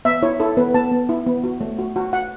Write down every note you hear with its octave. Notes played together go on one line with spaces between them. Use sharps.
B3 E5
E4 C#5
E4 A4
B3 B4
B3 A5
B3
E4
B3
F#4
A3
F#4
F#4
F#4 F#5